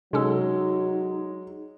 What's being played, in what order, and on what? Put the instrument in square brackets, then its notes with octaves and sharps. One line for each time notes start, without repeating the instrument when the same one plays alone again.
[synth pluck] C3 C#4 A4 [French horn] F#3 [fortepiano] G#3 [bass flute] D#4